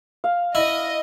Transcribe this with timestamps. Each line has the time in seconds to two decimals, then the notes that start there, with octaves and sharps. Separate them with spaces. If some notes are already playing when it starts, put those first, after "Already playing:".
0.24 F5
0.55 E4 D#5